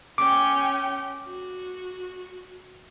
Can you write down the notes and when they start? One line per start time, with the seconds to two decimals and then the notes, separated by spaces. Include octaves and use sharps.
0.18 C#4 G5 D6
1.27 F#4